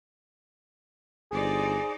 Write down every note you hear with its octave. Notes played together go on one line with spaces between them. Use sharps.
G1 D#4 G#4 C5 D5